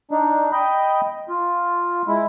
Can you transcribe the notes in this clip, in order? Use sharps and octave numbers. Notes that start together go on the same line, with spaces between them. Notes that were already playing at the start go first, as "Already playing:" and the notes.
D4 D#4
D#5 G5 B5
F4
G#3 E4